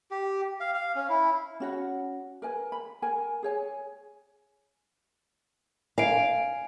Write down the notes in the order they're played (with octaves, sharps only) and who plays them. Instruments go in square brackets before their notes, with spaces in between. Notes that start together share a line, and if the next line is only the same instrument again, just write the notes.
[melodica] G4
F5
F5
C#4
E4
[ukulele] C#4 F#4 F#5
A#4 B4 G#5
B5
A#4 G#5
G#4 C#5 G#5
[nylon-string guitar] F5 [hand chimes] G#5 D7